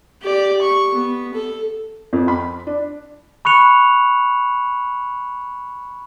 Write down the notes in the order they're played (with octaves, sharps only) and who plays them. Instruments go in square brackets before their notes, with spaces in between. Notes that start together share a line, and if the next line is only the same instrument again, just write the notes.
[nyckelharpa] G4 D5
C#6
B3
A4
[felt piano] F2
B5
D4
[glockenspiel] B5 C#6 F#6 C#7 F7